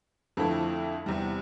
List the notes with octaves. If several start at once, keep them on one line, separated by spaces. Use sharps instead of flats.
F2 D3 F3 A3 E4
E2 C3 G3